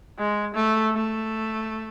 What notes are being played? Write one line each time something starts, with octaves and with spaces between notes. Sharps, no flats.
G#3
A3
A3